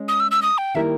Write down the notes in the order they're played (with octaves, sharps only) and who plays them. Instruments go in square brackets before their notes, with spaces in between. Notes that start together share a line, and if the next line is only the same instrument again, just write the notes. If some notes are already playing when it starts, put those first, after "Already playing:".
Already playing: [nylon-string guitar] G#3 C#4
[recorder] D#6
E6
E6
D#6
G5
[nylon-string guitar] D#3 G3 A#3 E4 A#4 [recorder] E5